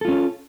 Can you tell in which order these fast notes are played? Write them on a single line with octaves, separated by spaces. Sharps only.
A4 F4 C#4